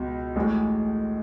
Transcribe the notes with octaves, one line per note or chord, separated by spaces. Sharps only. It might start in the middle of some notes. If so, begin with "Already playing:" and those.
Already playing: C#2 B2
A1 A2 G#3